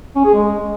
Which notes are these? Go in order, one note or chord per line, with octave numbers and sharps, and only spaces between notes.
C#4
G#4
G#3